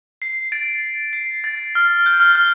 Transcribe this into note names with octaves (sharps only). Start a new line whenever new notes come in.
C7
A6 D7
C7
A6
F6
G6
F6
F6